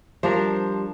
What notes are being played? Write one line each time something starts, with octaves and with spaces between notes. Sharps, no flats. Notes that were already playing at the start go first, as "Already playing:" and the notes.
F3 G3 D4 A#4 C5